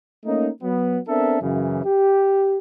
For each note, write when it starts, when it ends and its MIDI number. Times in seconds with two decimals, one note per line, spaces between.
0.25 0.49 57
0.25 0.49 58
0.25 0.49 61
0.25 0.49 63
0.62 0.98 54
0.62 0.98 59
1.07 1.39 59
1.07 1.39 60
1.07 1.39 62
1.07 1.39 69
1.07 1.39 70
1.07 1.39 76
1.41 1.79 42
1.41 1.79 49
1.41 1.79 52
1.85 2.58 67